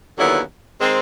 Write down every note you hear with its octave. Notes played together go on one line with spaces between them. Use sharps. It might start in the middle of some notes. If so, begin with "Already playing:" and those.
D#2 D3 F#3 B3 E4
D#3 G#3 C4